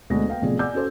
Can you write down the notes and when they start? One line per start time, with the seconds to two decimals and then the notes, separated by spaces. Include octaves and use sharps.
0.10 D2 B2 G#3 D4 A#6
0.28 B3 F5 G5
0.41 B1 A2 C3 F3 G#4 D5
0.59 D5 F#5 G#5 D6 E6 G6
0.74 C#4 F#4 A4 C5